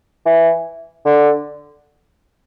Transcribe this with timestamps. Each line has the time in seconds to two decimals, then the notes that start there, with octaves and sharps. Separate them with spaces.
0.25 E3
1.05 D3